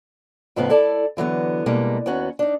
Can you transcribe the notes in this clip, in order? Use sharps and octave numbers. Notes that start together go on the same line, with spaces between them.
F2 A2 C#3 B3 D#4 F5
E4 A4 D5 A5
D3 E3 F#3 B3
B2 G3 G#3 A#3
D#2 B3 C#4 F#4
D4 D#4